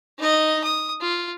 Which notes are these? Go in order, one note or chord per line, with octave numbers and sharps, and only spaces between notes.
D#4 D#5
D#6
F4